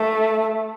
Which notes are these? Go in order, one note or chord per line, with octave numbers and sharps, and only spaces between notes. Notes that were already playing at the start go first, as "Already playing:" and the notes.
Already playing: A3